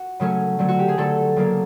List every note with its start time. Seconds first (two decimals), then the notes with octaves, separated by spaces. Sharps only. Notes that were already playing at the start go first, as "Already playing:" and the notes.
Already playing: F#4
0.20 C#3 F#3 A3 C#4
0.59 D3 F#3 A3 C4
0.68 F#4
0.79 G4
0.88 G#4
0.97 D3 F#3 A3 C4 A4
1.36 C#3 F#3 A#3 D4